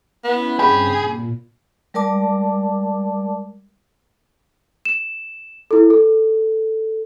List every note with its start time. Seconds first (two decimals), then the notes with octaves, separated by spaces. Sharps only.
0.24 B3 C#4 E4 B5
0.59 G2 C#3 C4 G4 G#4 B5
0.98 A#2
1.94 G3 G#3 A#4 D5 A5 D6
4.85 E7
5.71 E4 A4
5.90 A4